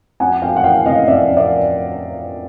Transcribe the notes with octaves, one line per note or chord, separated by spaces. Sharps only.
F2 F#5 G#5
F2 F5 G5
F#5
E3 F5 G5
C3 D#5 F5
F2 D5 E5
F2
D5 E5